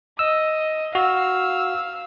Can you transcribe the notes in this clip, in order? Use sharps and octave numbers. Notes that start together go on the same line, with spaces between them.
D#5 E6
F#4 F5 E6